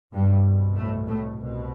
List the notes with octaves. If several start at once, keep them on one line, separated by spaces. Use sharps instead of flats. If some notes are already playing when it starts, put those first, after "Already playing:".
C2 G2 B2 G3
A2 A3
A2 A3
C2 B2